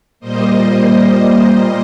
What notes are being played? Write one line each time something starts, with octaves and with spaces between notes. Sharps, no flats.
A#2 G3 A#3 C5 D#5
C5 D#5